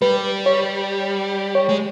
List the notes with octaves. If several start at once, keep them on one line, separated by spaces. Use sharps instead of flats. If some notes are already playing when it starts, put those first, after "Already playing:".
G3 B4
C#5
C#5
G#3